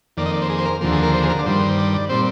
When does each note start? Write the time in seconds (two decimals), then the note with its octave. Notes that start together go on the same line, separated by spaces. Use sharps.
0.17 F2 D#3 A#3 D5
0.26 D#5
0.33 D5
0.42 C5
0.50 G#4
0.58 C5
0.65 A#4
0.81 D#2 D3 F3 A#3
0.92 G#4
1.03 A#4
1.14 C5
1.23 G#4
1.30 A#4
1.39 D5
1.46 G2 D#3 G3 C5
1.78 D5
1.94 D5
2.09 A#2 G3 C4 C5